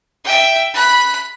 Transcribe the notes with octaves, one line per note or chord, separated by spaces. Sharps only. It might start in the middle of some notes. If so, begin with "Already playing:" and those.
E5 G5
B5 F#6